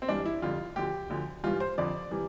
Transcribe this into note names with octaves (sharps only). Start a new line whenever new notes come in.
C4
G2 E3 G3 D4
E4
F2 D3 G3 F4
D2 D3 F3 G4
D2 D3 F3
G2 E3 G3 F4
C5
F2 D3 F3 D5
C3 E3 G3